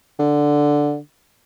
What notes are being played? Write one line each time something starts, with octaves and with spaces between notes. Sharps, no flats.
D3